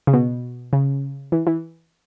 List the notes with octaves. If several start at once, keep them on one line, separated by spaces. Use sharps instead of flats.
C#3
B2
C#3
E3
E3